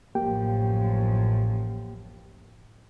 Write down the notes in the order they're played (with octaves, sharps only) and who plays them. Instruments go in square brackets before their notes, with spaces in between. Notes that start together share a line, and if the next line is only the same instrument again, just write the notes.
[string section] A1 F#2 F3 [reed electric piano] A#3 G4 G5